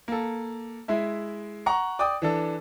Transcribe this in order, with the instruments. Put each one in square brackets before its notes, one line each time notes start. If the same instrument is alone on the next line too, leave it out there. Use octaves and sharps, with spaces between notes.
[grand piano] A#3 A4
G#3 E4 E5
F#5 A#5 C#6
D5 G5 D6 D#6
E3 D4 A4